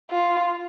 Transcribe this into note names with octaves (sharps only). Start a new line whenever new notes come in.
F4